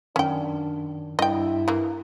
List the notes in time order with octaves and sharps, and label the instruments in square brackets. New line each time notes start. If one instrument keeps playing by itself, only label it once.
[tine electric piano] F#2 D#3 [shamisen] C#4 G5 [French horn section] D4
[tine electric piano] G2 [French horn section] E4 [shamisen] D#5 G5
[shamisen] E3 A#3